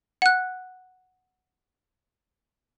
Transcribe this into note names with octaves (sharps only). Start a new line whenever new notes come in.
F#5 F#6